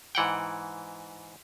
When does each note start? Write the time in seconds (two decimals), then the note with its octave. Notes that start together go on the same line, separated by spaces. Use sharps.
0.15 G#2 E3 F#5 G5